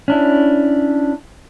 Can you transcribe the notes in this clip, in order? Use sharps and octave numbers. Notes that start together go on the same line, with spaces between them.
C#4 D4 E4